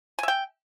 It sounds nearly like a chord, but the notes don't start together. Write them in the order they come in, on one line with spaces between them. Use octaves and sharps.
G#5 E5 G5